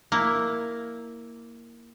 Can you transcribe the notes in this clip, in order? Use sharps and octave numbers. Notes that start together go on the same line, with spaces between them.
A#3 E4